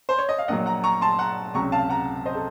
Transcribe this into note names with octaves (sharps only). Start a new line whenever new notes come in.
C5
C#5
D#5
F5
A#1 A#2 F#3 D#5 F#5
F#5 A#5
A#5 C#6
A5 C6
F#5 A#5
C#2 C3 F#3 A#5 C#6
F5 A5
F#5 A#5
C5 D#5
A4